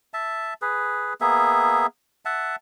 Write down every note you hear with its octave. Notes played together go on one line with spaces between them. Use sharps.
E5 A5
G#4 B4
A#3 B3 G#4 E5
E5 F#5 A5